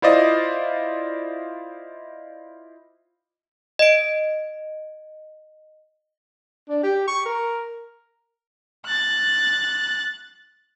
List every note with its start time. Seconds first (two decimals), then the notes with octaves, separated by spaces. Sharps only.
0.02 E4 F4 C5 D5 D#5
3.79 D#5 D7
6.69 D4
6.83 G4
7.07 C#6
7.26 A#4
8.86 F#6 A6